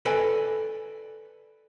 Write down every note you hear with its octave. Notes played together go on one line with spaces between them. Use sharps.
A4 B4 D5 G#5